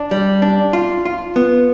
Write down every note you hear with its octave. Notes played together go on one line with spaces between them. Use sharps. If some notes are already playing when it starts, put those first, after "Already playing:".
Already playing: D4
G3
D4
F4
F4
B3